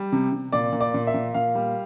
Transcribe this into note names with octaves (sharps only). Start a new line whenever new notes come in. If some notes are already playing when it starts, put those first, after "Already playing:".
Already playing: G3
C3
C3
A#2 D5
A#2
D5
A#2
E5
A#2
A#2 F5
G3